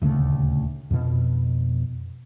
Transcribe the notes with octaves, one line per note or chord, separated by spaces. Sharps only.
D#1 D2 C#3 A3
F2 B2